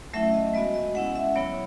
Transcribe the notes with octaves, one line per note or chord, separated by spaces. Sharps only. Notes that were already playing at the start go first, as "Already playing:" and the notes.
F#3 A3 C#4 E4 E5
D#5
G#3 B3 F#4 D#5
D#5
G#3 C#4 E4 F#5
E5
F#3 B3 E4 C#5